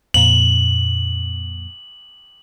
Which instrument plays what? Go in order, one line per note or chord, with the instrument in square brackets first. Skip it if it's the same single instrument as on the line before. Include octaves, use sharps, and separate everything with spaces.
[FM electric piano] F2 A#2 [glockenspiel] F#7